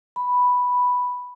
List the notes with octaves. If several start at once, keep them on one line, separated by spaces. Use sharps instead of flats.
B5